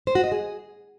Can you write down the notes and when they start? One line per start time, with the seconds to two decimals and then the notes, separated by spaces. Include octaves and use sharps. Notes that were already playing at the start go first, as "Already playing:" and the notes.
0.07 C5
0.15 F#4
0.23 D#5
0.32 G#4